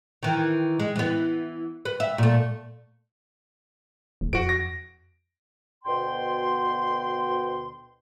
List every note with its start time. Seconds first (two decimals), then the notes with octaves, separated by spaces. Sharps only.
0.23 D#3 E3
0.79 G#3
0.96 E3 B3
1.85 B4
2.00 E5
2.18 A#2 A3
4.21 D#1
4.33 F2 F#4 D7
4.49 A#6
5.85 D2 B2 G5 C6